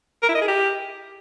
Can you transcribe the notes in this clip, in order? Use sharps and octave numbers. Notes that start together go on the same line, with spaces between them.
A#4
E4
D#5
G#4
G4